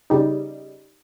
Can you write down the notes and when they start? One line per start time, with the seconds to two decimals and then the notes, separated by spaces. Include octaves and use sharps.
0.10 C#3 G3 D#4